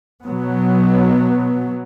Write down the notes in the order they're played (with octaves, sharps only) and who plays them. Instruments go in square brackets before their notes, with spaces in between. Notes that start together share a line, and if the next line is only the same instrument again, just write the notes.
[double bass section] B2 F#3 B3